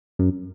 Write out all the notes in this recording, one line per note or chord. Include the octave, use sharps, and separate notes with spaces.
F#2